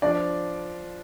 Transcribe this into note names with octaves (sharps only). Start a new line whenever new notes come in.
F3 D4 D5